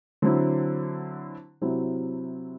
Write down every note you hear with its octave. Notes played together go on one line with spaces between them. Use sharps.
D3 F#3 C4 E4
C3 F#3 C4 E4